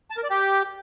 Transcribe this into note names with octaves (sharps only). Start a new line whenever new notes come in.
A5
A#4
D5
G4